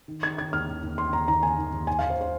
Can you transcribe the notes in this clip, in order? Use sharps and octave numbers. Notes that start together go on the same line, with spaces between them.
D#3
D#3 G#6
D#3 G#6
D#2 F6
D#3
D#2
D#3 C6
D#2 A#5
D#2 A#5
D#2 G#5
D#2
D#2
D#3 G#5
D#2 F5
C5
C5